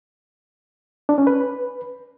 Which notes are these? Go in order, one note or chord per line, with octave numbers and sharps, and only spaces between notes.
D4
C#4
B4